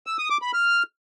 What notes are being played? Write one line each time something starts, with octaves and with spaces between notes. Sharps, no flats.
E6
D#6
D6
B5
F6